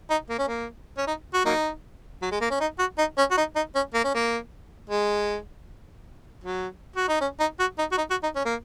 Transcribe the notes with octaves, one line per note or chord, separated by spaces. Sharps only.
D#4
A#3
C#4
A#3
C#4
D#4
F#4
F#3 A#3 D#4
F#3
G#3
A#3
C#4
D#4
F#4
D#4
C#4
F#4
D#4
D#4
C#4
A#3
C#4
A#3
G#3
F#3
F#4
D#4
C#4
D#4
F#4
D#4
F#4
D#4
F#4
D#4
C#4
A#3